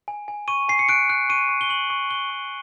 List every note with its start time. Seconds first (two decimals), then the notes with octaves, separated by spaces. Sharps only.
0.08 G#5
0.28 G#5
0.48 C#6 D#7
0.69 G#5 C7
0.79 C#7
0.89 F#6 D7
1.09 F#6
1.29 C#6 D#7
1.49 C#6
1.61 G7
1.70 C#6 F#7
1.90 C#6
2.10 F#6 G7
2.30 C#6